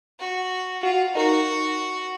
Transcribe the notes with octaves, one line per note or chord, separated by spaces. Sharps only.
F#4
F4 F#4
D#4 F#4 A#4